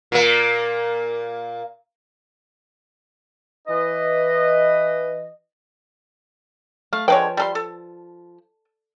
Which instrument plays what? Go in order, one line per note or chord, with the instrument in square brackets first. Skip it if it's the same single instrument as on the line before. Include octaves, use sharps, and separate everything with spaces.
[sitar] A#2 A#3
[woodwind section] E3 B4 D#5
[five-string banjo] A3 [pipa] F5
[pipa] D3 G#3 C#5 [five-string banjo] F3 B4 G5
[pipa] G3 A4 C6
A4